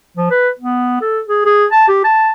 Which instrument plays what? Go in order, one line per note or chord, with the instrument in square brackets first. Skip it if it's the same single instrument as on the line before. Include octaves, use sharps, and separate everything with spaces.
[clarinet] F3
B4
B3
A4
G#4
G#4
A5
G4
A5